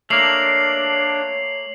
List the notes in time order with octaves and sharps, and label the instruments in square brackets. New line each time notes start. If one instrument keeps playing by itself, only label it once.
[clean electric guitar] A3 A#3 [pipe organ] D4 [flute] C#5 [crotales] C7 F7 F#7